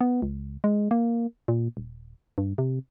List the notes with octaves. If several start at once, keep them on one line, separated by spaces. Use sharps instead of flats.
B3
C#2
G#3
A#3
A#2
D#1
G2
C3